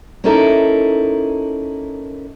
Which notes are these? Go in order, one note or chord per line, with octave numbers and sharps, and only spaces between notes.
A#3 C#4 D#4 E4 A4 A#4